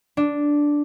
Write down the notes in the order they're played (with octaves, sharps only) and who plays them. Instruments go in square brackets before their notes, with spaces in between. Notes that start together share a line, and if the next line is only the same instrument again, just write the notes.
[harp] D4